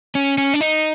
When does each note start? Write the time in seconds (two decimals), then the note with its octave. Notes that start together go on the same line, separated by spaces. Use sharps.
0.15 C#4
0.38 C#4
0.54 D4
0.61 D#4